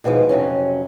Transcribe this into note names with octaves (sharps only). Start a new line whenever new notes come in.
D#2 B2 E3 F3 G#3
F2 C3 F#3 C#4